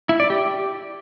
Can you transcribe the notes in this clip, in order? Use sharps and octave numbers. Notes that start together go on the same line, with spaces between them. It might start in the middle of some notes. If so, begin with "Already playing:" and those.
E4
D5
G4